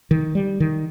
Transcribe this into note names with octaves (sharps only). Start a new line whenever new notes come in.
D#3
G3
D#3